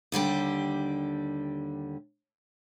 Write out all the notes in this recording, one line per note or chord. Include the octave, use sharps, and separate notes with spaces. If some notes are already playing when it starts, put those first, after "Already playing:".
D#2 D3 G3 G4